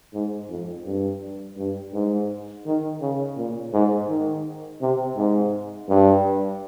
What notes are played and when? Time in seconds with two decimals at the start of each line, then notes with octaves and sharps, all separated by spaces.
0.13 G#2
0.49 F2
0.85 G2
1.57 G2
1.93 G#2
2.66 D#3
3.01 C#3
3.37 A#2
3.73 G#2
4.09 D#3
4.81 C3
5.17 G#2
5.89 G2